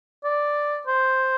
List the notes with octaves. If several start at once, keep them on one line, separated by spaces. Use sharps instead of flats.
D5
C5